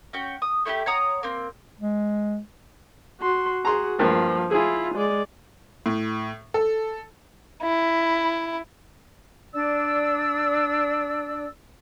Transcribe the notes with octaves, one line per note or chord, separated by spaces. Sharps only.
C#4 F#4 G5
D#6
A3 E4 F#4 G4
C#5 F#5 A#5 D#6
A#3 C4
G#3
F#4 C6
F#4 G#4 A#5 C6
G2 F3 A#3
E4 F4 G#4 G#5
G#3 D5
A2
A4
E4
D4 D5 E6